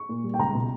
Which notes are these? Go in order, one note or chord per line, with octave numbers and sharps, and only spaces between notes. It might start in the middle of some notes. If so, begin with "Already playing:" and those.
Already playing: C#6
A#2
G3
G5
C#2 A#5
B2